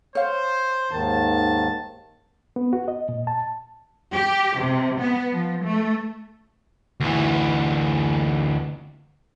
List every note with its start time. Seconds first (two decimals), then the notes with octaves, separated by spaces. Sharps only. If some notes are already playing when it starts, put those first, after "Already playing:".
0.15 C5 C#5 F5
0.91 D#2 G#2 D#3 A5
2.56 B3
2.73 F#4
2.88 D#5
3.09 A#2
3.27 A5
4.14 G4
4.60 C3
4.99 B3
5.33 F3
5.65 A3
7.00 D2 E3